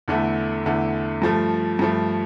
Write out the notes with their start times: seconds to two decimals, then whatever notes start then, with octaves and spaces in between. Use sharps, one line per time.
0.08 E2 D3 A3 E4
0.66 E2 D3 A3 E4
1.22 G2 F3 A3
1.79 G2 F3 A3